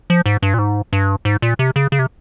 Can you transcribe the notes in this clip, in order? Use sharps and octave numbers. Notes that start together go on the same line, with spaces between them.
F3
G#2
G2
A#2
G#2
G2
G#2
A#2
C3
C#3
C#3
C3